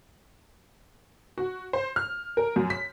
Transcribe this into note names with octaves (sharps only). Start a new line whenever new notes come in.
F#4
C5
F6
A#4
F#2
B6